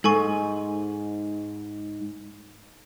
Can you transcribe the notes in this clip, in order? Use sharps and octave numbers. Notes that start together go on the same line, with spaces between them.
G#2 A4 G#5 C#6